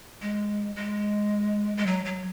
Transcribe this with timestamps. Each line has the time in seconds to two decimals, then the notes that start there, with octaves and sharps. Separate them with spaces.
0.22 G#3
0.76 G#3
1.77 G#3
1.86 F#3
2.05 F#3